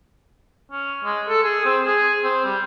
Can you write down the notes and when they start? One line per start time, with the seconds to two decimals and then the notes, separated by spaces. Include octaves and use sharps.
0.71 C#4
1.05 G#3
1.29 A4
1.43 G#4
1.64 C4
1.85 G#4
2.23 C4
2.44 G3